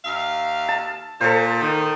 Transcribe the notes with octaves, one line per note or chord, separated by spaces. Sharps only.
D#2 E5 F5
A5
A#2 A4 C5
D#3